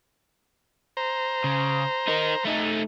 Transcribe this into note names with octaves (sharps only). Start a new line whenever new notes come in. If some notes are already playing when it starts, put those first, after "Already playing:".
C5 A#5
C#3
D#4 A#4
A3 D#4